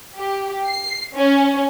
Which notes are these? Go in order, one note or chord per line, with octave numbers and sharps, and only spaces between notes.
G4
C7
C#4